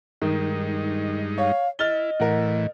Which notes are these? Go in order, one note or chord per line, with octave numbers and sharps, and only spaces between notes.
G2 D#3 G#3 D#4
C#5 F5
E4 D#5 F6 A6 G7
A2 E3 A#4 F#5